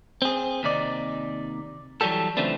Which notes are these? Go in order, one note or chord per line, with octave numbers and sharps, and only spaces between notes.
C4 G#4
D#2 C3 D#4 D5
E3 F#3 G3 G4 A4
C#3 E3 F3 A3 C4 D4